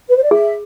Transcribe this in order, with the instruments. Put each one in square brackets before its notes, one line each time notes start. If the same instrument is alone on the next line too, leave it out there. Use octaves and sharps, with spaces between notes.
[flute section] B4
C5
D5
[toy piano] G#4 [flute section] E5